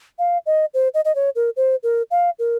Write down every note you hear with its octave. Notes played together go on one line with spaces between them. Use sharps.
F5
D#5
C5
D#5
D#5
C#5
A#4
C5
A#4
F5
A#4